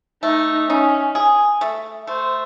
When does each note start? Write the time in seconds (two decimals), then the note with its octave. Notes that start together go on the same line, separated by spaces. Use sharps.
0.23 A3 D#4
0.69 C#4 D#4
1.15 G#4
1.61 A3
2.07 A3 C5